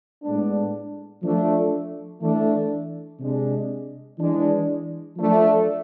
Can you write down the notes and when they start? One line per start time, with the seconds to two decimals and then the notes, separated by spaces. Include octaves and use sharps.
0.23 A2 G#3 B3 D4
1.22 F3 A3 D4
2.21 E3 A3 D4
3.19 C3 G#3 D4
4.19 E3 G#3 D4
5.17 F3 A3 D4